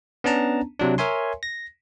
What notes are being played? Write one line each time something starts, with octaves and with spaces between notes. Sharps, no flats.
B3 C#4 D4 A5 A#5
C3 F#3 D4
A#4 C#5 E5 G#5 C6
A#6